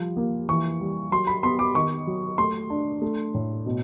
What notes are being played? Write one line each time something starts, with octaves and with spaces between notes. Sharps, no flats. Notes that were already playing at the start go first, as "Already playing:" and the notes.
Already playing: F3 G3
A#3
E3 C#6
G3
F#3 C6
B5
B3 C6
D6
D#3 C#6
F#3
A3 C6
D4
A3
A2
B2